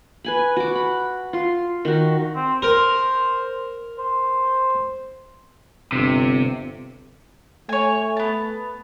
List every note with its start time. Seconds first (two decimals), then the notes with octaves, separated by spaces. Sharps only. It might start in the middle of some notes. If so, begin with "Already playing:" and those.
0.24 B4 G#5 B5
0.56 F#4 D6
0.75 B5
1.33 F4 C6
1.85 D#3 F#4
2.36 C4
2.62 A#4 C5
3.98 C5
5.92 G1 C3
7.69 A3 C#5 G#5
8.17 B3 A5